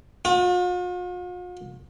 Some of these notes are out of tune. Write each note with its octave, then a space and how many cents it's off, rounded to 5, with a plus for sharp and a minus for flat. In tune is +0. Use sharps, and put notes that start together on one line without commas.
F4 +45